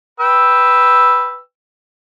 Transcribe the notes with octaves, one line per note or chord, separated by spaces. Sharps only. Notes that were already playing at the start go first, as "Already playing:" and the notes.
B4 G5 E6